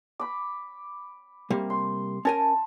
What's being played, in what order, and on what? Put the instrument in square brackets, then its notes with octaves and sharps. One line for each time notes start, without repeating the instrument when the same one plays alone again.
[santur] B5 D6
[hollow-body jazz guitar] C3 G3 A#3
[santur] C6
[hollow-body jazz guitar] C#4 A#4 G#5 [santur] A5